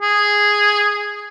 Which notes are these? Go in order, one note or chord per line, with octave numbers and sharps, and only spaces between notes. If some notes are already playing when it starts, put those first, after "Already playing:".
G#4